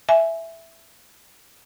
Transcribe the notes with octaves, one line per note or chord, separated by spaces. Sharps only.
E5 G#5